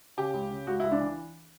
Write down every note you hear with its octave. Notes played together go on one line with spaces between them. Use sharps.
C#3 G4
C#2
C#3
C#2 F#4
C#2 E4
D4
E3